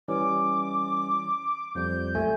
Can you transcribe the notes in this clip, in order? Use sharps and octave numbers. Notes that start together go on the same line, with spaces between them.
E3 G3 C#4 D6
F2 F3 G3 G6
B1 A3 G#5